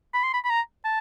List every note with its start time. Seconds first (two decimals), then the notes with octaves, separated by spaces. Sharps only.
0.14 B5
0.23 C6
0.34 B5
0.44 B5
0.50 A#5
0.85 A5